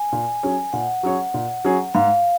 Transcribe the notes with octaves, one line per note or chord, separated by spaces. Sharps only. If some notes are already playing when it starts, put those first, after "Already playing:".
Already playing: G#5
A#2
F#3 C#4 G#4 C#5
A#2 F#5
F#3 C#4 G#4 C#5
A#2
F#3 C#4 G#4 C#5
G#2 F5